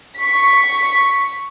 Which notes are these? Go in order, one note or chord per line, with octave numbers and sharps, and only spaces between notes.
C#6 B6